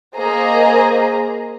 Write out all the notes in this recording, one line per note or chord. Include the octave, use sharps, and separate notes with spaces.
A#3 G#4 C5 D#5 A#5